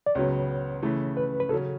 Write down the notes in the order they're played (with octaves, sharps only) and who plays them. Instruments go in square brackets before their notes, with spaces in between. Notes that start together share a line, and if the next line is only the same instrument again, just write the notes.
[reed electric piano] D5
[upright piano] C#2 C#3 F#3 B3 [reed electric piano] C#5
[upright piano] C#3 E3 A3
[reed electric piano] B4
B4
[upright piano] C#3 [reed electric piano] A4
[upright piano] F#3 C#4